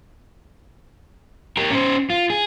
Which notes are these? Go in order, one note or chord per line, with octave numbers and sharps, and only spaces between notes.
G4 A#4
C#4 C5
F4
G#4